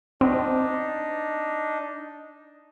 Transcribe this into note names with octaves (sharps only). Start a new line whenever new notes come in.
C4 D4 D#4